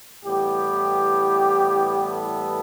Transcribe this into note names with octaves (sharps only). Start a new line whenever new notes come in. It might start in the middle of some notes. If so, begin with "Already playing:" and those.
A2 E3 G3 B3 G4
A4